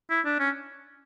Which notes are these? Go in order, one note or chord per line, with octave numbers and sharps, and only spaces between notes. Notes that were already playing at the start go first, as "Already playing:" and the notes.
E4
D4
C#4